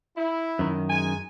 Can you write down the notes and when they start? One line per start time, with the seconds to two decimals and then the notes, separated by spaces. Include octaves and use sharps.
0.17 E4
0.59 F#2 D#3
0.89 G#3 G#5